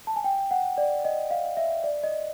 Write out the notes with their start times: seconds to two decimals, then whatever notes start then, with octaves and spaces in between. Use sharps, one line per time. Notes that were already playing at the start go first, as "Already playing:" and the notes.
0.07 A5
0.16 G#5
0.24 G5
0.51 F#5
0.78 D5
1.05 D#5
1.31 F5
1.57 E5
1.84 D5
2.03 D#5